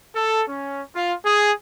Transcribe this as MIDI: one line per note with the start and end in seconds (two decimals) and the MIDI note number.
0.14 0.42 69
0.48 0.83 61
0.94 1.13 65
1.24 1.51 68